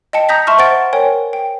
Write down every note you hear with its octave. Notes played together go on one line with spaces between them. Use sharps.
D#5 G5 A5 C#7
A#5 D#6 G6 A#6 B6
E5 A5 C6 C#6 F6
C5 F#5 C6 A6 D7
A#4 C#5 G5 G#5
G5